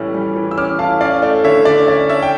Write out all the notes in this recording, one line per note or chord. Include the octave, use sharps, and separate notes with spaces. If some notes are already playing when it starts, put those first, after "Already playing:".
Already playing: A2 E3 G3 C#4
G3
E3
E6
C#4 D6 F6
A2 F5 A5
C#4 D5 F5
A3 D5
D3 C#5 E5
D3 D5
C#4 D5
A3 C#5 E5
G5